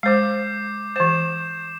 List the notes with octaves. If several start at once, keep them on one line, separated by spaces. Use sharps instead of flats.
G#3 C5 D6 G6 C7
E3 C5 G6 E7